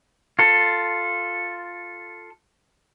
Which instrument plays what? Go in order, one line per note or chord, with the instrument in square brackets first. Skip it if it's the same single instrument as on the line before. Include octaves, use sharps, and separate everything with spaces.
[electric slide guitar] F4 A4